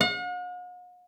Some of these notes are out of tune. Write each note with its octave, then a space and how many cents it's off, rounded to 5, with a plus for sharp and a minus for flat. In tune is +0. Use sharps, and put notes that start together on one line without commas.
F#5 -45